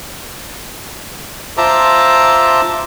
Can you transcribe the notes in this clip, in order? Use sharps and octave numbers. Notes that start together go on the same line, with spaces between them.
F4 C5 E5 A5 A#5 D6